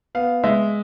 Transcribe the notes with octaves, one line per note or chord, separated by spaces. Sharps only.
B3 F5
G#3 E5